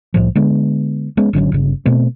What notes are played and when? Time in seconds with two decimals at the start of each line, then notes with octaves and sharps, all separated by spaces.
0.14 C2 A2 F3
0.35 D3 G#3 B3
1.17 G#3 B3 C#4
1.33 G#1 D3 F#3 C#4
1.52 G1 C#3
1.85 B2 A3 C4